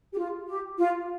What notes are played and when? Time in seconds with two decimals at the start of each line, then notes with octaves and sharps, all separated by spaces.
0.13 G4
0.18 F4
0.48 G4
0.78 F4